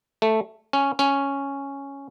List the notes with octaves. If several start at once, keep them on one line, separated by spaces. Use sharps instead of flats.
A3
C#4
C#4